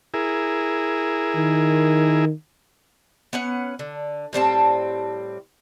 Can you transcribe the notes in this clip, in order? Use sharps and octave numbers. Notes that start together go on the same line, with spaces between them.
E4 G#4 A#4
D#3
B3 C#4 F#5
D3
A2 G3 C4 A5